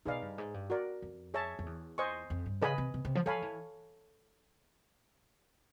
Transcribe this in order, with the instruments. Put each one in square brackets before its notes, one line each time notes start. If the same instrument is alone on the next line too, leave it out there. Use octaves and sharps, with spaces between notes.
[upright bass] B2 [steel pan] D#4 G#4 B4 D5 F5
[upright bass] G2
G#2
G2
[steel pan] F#4 A#4 D5
[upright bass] F2
[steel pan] G#4 C#5 E5 A5
[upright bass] F2
E2
[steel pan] C5 D#5 G#5 C#6
[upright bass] F2
G2
[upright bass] C#3 [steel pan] B4 D#5 G#5 B5
[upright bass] C3
C3
C3
F3
[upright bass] F3 [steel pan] A4 C#5 F5 G#5 B5
[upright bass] E3